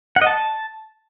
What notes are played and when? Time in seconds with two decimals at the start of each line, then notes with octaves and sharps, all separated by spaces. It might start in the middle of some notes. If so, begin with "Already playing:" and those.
0.16 F#5
0.21 D#5
0.27 A5